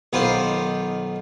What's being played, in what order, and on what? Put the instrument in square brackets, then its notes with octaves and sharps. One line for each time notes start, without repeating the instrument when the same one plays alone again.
[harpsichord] B1 D#3 B3 F4 C5